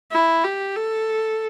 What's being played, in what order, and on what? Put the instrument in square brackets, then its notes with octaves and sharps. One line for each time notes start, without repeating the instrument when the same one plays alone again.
[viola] E4
G4
A4